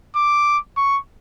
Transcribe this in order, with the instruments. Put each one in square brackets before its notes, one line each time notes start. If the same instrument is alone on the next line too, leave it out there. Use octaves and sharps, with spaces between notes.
[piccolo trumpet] D6
C#6